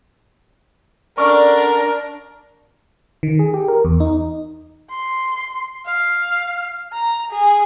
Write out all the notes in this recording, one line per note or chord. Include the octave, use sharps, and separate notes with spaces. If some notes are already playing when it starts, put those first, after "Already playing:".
D3 C#4 D4 A#4 D5 C#6 F6
D#3
G#4
G4
A#4
E2
D#4
C6
F5
A#5
G#4